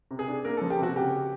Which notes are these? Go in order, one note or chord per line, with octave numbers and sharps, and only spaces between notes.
C3
G#4
D4
A#3 A#4
A4
F3
G4
C3 F#4
C#3 G4